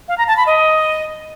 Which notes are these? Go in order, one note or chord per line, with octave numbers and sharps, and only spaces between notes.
F5
A#5
A5
B5
D#5